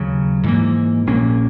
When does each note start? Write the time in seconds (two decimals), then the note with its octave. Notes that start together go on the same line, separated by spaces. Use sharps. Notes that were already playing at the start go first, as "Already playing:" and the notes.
Already playing: D#2 C#3 F#3
0.44 G#2 E3 A#3
1.07 A#1 A#2 A#3 C#4